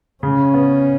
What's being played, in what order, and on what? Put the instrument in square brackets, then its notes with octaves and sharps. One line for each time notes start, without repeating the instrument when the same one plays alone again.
[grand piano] C#3 [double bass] C#4
[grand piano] B3